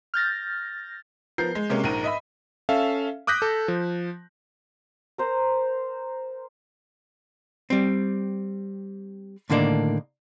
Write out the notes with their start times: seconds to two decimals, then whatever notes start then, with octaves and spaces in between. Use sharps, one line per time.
0.14 F6 G6 A6 A#6
1.38 F3 B3 A#4 G6 C7
1.55 G#3
1.70 C3 G#3 A#3 C#4
1.84 A#1 G#2 A#4 D#7
2.04 D#5 E5 B5
2.69 C#4 A4 E5 F5
3.27 D6 D#6 F#6 G6 A#6 B6
3.42 A4
3.68 F3
5.18 A#4 C5 A#5
7.70 G3 C4
9.50 A2 D3 D#3 A#3 D4